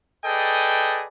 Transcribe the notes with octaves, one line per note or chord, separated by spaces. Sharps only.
G#4 A4 B4 D5 D#5 G5